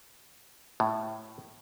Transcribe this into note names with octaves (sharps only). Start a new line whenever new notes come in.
A2